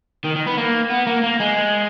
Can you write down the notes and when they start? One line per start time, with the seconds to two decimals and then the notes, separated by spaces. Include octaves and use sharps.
0.24 D#3
0.36 D#3
0.46 B3
0.57 A#3
0.90 B3
1.07 A#3
1.23 A#3
1.40 G#3